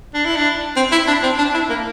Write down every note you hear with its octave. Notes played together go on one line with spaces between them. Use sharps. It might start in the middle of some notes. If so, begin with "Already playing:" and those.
D4
E4
D4
C4
E4
D4
C4
D4
E4
A#3